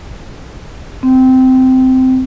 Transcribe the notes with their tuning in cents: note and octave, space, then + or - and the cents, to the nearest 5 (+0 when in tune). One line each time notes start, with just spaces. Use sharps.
C4 -15